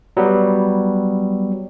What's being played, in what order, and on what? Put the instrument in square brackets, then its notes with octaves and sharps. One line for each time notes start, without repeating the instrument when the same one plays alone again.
[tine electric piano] F#3 G3 B3